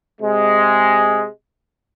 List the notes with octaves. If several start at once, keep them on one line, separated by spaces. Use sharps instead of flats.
C3 G#3